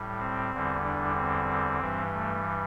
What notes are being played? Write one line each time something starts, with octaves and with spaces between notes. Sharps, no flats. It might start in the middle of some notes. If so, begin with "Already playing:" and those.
Already playing: A2 G3
C4
E2 D3 G3
D4
C4
G2 E3 G3
A3